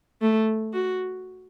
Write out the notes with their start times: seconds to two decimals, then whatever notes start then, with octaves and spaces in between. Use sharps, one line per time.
0.22 A3
0.73 F#4